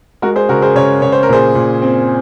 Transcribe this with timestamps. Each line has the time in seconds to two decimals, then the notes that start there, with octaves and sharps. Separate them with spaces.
0.22 G#3 F#4 A#4
0.36 G#4 C5
0.49 C#3 F#4 A#4
0.62 G#4 C5
0.75 C#3 A#4 C#5
1.02 C#3 C#5
1.12 C5
1.23 A#4
1.29 A#2 G#4 C5
1.55 A#2
1.82 C4